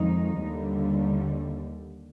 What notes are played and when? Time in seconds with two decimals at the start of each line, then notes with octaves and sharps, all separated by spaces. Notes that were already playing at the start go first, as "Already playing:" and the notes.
Already playing: F2 D#3 G#3 D#4
0.37 D#2 D3 G3